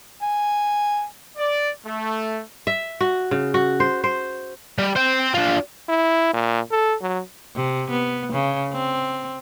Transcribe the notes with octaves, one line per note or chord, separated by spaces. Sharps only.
G#5
D5
A3
E5
F#4
C#3
F#4
C5
C5
G3
C5 G5
D4 F4
E4
A#2
A4
F#3
C3
B3
C#3
C4